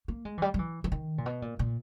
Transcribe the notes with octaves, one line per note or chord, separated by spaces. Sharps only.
A#3
G#3
E3
G3
G3
E3
E3
D#3
A#2
B2
A#2
A#2